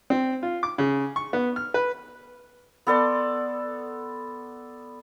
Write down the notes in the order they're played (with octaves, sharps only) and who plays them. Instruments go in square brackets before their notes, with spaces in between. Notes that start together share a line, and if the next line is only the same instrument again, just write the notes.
[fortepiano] C4
F4
D6
C#3
C#6
B3
F6
B4
[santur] B3 A4 D5 C6